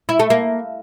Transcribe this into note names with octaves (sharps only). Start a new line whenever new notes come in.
E4
A3
A#3